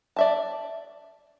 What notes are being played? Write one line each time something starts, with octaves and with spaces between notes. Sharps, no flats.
D5 E5 A5